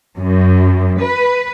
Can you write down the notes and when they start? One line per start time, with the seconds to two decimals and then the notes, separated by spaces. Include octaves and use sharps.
0.17 F#2
1.02 B4